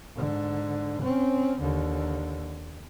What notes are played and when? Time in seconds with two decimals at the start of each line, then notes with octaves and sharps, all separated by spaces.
0.16 G#2 D3
1.02 C4 C#4
1.61 D#2 D3